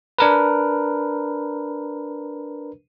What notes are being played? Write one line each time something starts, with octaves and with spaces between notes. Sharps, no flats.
D4 A#4 B4